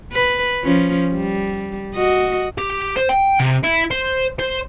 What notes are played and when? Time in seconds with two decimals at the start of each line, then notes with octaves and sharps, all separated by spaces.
0.13 B4
0.64 F3 C#4
1.14 G3
1.95 F#4 D#5
2.58 G4
2.97 C5
3.10 G5
3.40 C3
3.64 E4
3.91 C5
4.40 C5